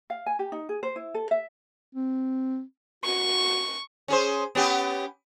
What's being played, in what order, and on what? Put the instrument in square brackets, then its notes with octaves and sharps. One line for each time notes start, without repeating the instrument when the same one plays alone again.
[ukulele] F5
G#5
G4
D#4
G#4
C5
E4
A4
E5
[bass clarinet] C4
[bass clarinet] F#4 [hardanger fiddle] C#6
[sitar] C#4 G#4 C5
B3 C#4 G4